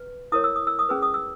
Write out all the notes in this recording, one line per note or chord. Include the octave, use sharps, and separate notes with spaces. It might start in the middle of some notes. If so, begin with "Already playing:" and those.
Already playing: B4
E4 A#4 C#5 D#6
E6
D#6
E6
D#6
C#4 G#4 B4 E6
D#6
E6